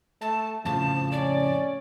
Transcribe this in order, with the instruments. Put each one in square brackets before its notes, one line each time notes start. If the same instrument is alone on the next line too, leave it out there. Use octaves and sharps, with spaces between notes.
[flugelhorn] A3 [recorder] A5
[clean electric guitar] F2 A2 C#3 [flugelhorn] F3 [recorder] A5
[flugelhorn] C#4 [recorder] D5